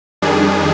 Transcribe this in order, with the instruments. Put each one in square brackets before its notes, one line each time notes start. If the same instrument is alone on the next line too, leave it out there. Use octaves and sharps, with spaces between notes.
[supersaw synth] F2 D#3 G3 D4 G#4